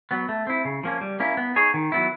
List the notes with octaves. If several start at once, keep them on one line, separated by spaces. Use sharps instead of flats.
F#3 B3
A3
C4 E4
C#3
F3 A#3 C#4
G3
A#3 C#4 E4
B3
D#4 G#4 C#5
D#3
F#3 B3 E4